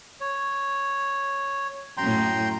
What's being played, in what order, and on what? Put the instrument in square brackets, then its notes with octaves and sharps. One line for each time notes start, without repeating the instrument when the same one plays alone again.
[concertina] C#5
[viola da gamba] F#2 A2 [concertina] G5 A#5 C6